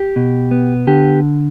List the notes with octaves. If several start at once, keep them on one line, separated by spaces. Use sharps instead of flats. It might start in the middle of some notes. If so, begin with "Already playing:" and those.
Already playing: G4
B2
B3
D3 G4